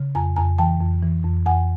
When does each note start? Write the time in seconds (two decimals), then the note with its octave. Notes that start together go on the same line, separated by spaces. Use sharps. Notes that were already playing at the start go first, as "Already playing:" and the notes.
Already playing: C#3
0.15 F2 G#5 A#5
0.36 F2 G#5 A#5
0.58 E3 G5 A5
0.80 F2
1.03 E3
1.24 F2
1.46 F2 F#5 G#5